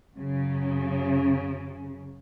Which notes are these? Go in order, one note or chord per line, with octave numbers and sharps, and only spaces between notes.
F#2 C#3